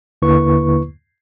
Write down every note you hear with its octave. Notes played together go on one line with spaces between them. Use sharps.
D#2 D3 A#3 E4 B4 C#6